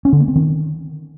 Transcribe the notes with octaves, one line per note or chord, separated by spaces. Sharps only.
C#4
D3
A#3
C4
D#3